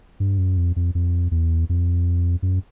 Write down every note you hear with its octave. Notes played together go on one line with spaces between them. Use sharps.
G2
F#2
F2
F2
F2
E2
F2
F#2